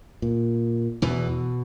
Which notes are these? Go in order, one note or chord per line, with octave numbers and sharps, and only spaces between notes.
A#2
E2 B2 E3